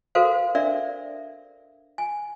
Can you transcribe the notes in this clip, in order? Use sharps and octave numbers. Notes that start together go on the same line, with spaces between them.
F#4 A4 A#4 C5 F5
D4 A#4 D5 E5
G#5